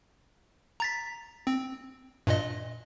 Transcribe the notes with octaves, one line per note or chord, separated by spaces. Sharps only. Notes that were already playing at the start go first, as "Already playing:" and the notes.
A#5 A6 B6
C4
G2 A#2 D#5